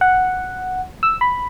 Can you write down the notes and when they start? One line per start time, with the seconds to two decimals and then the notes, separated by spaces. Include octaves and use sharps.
0.01 F#5
1.03 E6
1.21 B5